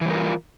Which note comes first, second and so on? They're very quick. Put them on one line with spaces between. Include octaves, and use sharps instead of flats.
E3 G3 A#4 F4